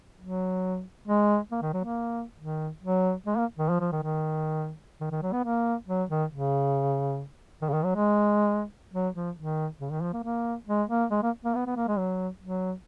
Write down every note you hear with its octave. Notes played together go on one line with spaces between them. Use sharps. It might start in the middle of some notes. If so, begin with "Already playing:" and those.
F#3
G#3
A#3
D#3
F#3
A#3
D#3
F#3
G#3
A#3
D#3
F3
F3
D#3
D#3
D#3
D#3
F#3
B3
A#3
F#3
D#3
C#3
D#3
C#3
D#3
F#3
G#3
F#3
F3
D#3
C#3
D#3
F3
A#3
A#3
G#3
A#3
G#3
A#3
A#3
B3
B3
A#3
G#3
F#3
F#3